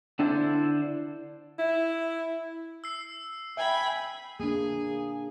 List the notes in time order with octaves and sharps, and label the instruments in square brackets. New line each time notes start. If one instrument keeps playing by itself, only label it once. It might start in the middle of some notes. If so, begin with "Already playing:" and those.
[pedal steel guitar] D3 D4 E4 A4 C5
[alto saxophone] E4
[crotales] E6 C7
[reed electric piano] E5 [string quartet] G5 G#5 B5
[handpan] A#3 D4 [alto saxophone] G#4